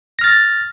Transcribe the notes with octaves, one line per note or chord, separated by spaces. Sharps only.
F6 A6 A#6